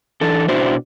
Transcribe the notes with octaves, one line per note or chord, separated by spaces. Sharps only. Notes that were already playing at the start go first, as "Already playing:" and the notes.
E3 D4 A4
B2 D4 E4 F#4 C5